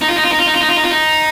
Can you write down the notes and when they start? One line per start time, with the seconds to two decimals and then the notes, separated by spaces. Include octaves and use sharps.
0.01 D#4
0.08 F4
0.16 D#4
0.23 F4
0.31 D#4
0.39 F4
0.46 D#4
0.54 F4
0.61 D#4
0.69 F4
0.76 D#4
0.84 F4
0.90 D#4